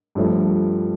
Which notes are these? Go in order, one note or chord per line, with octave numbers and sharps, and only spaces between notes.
G2 F3 A3